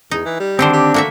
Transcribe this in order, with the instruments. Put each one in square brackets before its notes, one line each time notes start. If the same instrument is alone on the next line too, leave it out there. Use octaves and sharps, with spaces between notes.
[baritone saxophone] E2 [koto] D#4
[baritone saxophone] E3
G3
[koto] D3 D#3 C5 [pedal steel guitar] C4 D4
[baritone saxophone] G4
[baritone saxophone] A3 [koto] A#3 F#4 E5